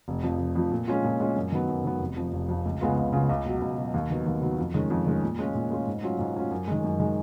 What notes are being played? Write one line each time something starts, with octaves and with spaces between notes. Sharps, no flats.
F1
F2 F3
F1
F2 F3
A#2
G#3 C#4 F4
A#2
G#3 C#4 F4
F#2
D#3 F#3 B3
F#2
D#3 F#3 B3
F1
F2 F3
F1
F2 F3
C#2
C#3 G#3 B3 F4
C#2
C#3 G#3 B3 F4
C#2
B2 F#3
C#2
B2 F#3
D#2
D#3 F#3 B3
D#2
D#3 F#3 B3
F2
D#3 G#3 C#4
F2
D#3 G#3 C#4
A#2
G#3 C#4 F4
A#2
G#3 C#4 F4
G#2
F#3 C#4 F4
G#2
F#3 C#4 F4
F#2
D#3 G#3
F#2
D#3 G#3